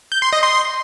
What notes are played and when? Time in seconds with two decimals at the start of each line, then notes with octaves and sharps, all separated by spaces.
0.12 G6
0.22 C6
0.33 D#5
0.43 C6